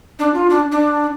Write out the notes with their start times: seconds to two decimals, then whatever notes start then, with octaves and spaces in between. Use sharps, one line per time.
0.19 D4
0.34 F4
0.50 D4
0.72 D4